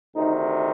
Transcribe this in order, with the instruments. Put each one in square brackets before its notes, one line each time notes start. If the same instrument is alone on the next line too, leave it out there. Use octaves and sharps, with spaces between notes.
[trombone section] D2 C3 D#3 D#4